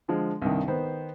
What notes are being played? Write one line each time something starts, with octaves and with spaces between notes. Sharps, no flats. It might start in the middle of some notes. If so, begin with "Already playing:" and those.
D3 F3 G#3
C2 G2 D#3
D#3 B3 C5